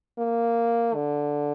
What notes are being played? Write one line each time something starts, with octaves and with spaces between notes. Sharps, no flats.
A#3
D3